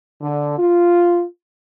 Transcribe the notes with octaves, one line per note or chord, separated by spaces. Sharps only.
D3
F4